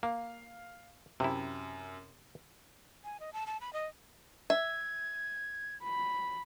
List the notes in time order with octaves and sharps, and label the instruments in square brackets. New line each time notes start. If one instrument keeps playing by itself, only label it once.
[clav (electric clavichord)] A#3 [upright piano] F5
[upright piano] F#2 [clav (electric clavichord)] C3 E4
[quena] G#5
D#5
A5
A5
B5
D#5
[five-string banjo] E5 [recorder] G#6
[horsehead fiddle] B5